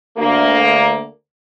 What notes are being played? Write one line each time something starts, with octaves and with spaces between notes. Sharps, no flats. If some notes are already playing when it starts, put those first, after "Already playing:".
D2 A#3